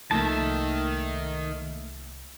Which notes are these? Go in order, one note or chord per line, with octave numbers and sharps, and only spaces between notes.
C2 D#3 F3 A3 A#3 E5 A5